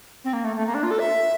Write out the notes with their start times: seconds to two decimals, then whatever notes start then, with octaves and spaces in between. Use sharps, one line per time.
0.24 C4
0.33 A#3
0.44 A3
0.56 A3
0.67 A#3
0.74 D4
0.83 F4
0.91 A4
0.99 E5